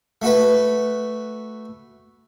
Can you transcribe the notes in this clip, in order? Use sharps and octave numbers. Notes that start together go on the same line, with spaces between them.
A3 F#4 B4